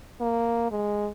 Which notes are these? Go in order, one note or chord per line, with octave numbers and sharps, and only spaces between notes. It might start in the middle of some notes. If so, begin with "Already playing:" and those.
A#3
G#3